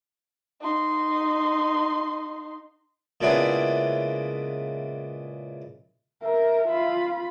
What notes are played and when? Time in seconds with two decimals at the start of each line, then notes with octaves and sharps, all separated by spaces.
0.61 D#4 C6
3.21 A#2 C#3 G#3 B3 D4 E4
6.23 A#4 E5
6.68 F4 B5